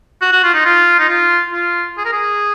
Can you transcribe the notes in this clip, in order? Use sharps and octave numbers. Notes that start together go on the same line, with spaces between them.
F#4
F#4
F4
D#4
F4
D#4
F4
F4
G#4
A#4
G#4